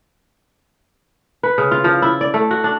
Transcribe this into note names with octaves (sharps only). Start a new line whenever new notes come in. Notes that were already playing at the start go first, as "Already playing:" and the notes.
B4
C#3
F4
F3
E4
D5
A3
F#4
D4